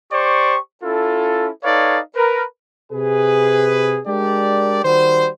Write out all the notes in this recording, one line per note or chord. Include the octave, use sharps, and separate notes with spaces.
G4 C5 D5 C#6
C#4 E4 F4 A4
D#4 A4 B4 C#5 D5 F5
A#4 B4
C3 G#4 B4
G#3 D4 G4 A#4 D5
D#3 G3 F#4 C5